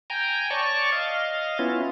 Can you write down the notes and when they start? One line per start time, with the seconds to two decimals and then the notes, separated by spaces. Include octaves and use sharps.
0.10 G5 G#5 A#5
0.51 C#5 D5 A5 C#6
0.92 D#5 F5
1.59 B3 C#4 E4 F4